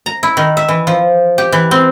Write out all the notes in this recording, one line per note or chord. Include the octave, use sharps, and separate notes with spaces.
A#5
E4
D#3
E5
E3
F3
G4
E3
C4